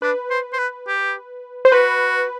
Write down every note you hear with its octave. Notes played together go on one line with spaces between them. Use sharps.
D4 B4
C5
C5
B4
G4
C5
F#4 B4